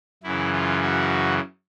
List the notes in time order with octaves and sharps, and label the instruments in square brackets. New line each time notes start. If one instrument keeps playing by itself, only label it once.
[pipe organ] F#2 C#3 E3 E4
F4
F#4